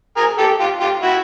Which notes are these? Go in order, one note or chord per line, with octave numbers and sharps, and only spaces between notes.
G#4 A#4
G4 A4
F4 G4
F4 G4
E4 F#4